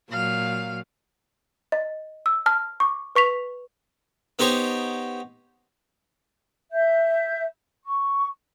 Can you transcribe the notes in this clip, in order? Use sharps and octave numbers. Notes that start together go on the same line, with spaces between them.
A#2 F#3 F5
D#5
E6
A5 F6
C#6 D6
B4 C#6 B6 F7
B3 D#4 G4 C5 C#5
E5 G6
C#6